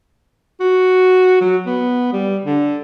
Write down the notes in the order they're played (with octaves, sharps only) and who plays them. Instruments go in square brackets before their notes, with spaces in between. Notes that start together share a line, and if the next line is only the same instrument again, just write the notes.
[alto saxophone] F#4
F#3
B3
G3
D3